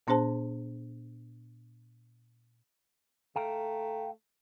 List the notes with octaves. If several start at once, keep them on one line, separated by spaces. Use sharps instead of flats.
A#2 B3 D4 G#4 C5 A5
A3 F5 G5 A#5